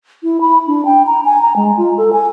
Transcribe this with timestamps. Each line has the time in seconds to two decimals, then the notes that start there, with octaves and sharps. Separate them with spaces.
0.23 E4
0.41 B5
0.67 D4
0.85 G5
1.07 A#5
1.25 G#5
1.42 A#5
1.56 G#3
1.77 F4
1.98 A4
2.13 G#5